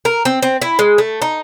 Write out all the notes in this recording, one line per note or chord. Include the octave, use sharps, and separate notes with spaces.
A#4
C4
C4
E4
G#3
A3
D#4